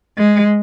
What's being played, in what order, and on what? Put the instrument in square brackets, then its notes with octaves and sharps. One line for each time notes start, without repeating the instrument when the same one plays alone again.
[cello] G#3